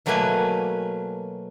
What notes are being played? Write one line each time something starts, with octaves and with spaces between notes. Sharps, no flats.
B2 F#3 A3 A#3 B4 G#5